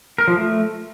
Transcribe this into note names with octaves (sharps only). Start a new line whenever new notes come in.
A#4
F3
A3